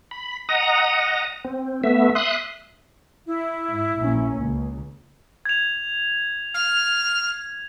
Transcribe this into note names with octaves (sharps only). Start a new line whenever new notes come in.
B5
D#5 F#5 A#5 D#6
C4
A3 B3 E5
E5 C6 D#6 F#6
E4
G#2
A#1 A#3 C#4
C#2 C#3
G#6 F7
F6